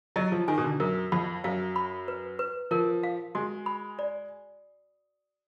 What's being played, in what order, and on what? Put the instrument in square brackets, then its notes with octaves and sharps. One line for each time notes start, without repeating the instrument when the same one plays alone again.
[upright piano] F#3 [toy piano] D#5
[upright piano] F3
[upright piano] D#3 [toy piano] G#5
[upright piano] B2
D3
[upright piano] F#2 [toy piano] A#4
[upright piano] F2 [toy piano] B5
[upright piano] F#2 [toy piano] F5
[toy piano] B5
B4
B4
[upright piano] F3 [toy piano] A#4
[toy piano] F5
[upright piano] G#3 [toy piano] F#4
[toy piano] B5
D5